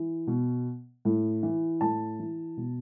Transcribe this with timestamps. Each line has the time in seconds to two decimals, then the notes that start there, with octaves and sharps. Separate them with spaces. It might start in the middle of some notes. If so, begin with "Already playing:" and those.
Already playing: E3
0.27 B2
1.05 A2
1.43 E3
1.81 A2 A5
2.19 E3
2.57 B2